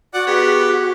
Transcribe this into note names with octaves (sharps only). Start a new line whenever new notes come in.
F#4 D5 F#5
B3 G4 G#4